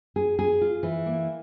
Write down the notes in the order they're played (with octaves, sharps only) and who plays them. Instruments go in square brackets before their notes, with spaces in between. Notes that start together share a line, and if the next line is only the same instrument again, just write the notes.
[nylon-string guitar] G#4
G#4
F4
E3
A#3